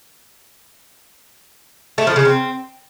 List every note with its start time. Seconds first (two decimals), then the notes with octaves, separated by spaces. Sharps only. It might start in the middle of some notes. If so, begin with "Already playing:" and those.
1.98 A3
2.07 F3
2.16 C#3
2.25 C4